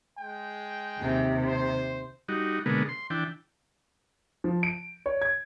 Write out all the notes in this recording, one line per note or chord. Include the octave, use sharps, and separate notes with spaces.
G#3 G5
D#2 C3
C5
G3 D#4 F#4
B2 D3 G#3 A#3 B3
C6
E3 D4 G5
F3
D7
C#5
G#6